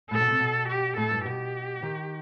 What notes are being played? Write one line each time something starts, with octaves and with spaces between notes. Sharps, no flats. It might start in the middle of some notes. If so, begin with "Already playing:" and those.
A2 A4
B2
C3
B2
G4
A2 A4
G2
B2 G4
D#3